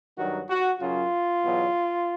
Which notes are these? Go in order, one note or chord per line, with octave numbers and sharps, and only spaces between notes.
G2 D#3 F#3 F#4
F#4
F#2 C#3 F#3 F4
E2 B2 F#3